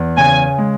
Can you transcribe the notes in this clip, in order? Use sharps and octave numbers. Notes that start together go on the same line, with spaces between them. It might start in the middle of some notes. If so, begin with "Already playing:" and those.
Already playing: E2
C#3 G#5
G#3